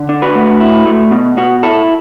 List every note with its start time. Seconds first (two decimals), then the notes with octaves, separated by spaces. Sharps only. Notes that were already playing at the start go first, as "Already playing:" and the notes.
Already playing: D3
0.09 D4
0.22 F#4 B4
0.35 A3
0.60 E4
0.86 A3
1.11 B2
1.38 B2 F#4
1.63 E4 A4